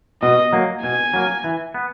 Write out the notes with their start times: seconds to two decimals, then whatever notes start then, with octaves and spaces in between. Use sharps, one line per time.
0.22 B2 D#5
0.53 F#3 A#3
0.83 B2 G#5
1.14 F#3 A#3
1.44 E3
1.74 B3